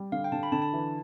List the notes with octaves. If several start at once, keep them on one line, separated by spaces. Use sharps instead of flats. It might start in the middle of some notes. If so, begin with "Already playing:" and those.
Already playing: G3
D3 F5
G5
D3 A5
B5
D3 A5
A5
E3